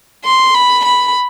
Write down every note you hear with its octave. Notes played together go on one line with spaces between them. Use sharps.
C6
B5
B5